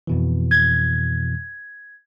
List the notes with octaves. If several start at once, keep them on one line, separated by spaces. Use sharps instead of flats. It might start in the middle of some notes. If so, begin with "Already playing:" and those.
F2 B2 E3
G#6